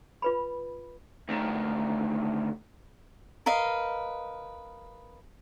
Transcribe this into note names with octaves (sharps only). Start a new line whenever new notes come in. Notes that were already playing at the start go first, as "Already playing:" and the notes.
F4 B4 B5
D2 D#3
A#4 B4 D#5 F5